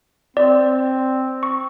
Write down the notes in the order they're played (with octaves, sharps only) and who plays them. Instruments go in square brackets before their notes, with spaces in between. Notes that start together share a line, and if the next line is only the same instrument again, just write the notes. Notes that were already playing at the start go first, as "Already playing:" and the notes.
[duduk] C4 [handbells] D5
[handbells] C#6